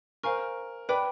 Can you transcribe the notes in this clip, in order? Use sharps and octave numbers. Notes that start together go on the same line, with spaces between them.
A#4 C5 F5 G#5 C#6 F6
B4 D5 G5 B5 D6 F#6